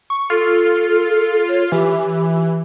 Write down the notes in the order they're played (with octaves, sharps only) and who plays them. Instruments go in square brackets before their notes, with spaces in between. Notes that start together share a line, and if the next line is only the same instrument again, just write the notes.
[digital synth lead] C#6
[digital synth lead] F4 [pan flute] A4
[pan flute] C#5
[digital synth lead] E3 [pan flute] G4